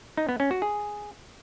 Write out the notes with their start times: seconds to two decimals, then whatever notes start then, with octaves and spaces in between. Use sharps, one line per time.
0.17 D#4
0.29 B3
0.40 C#4
0.51 F#4
0.62 G#4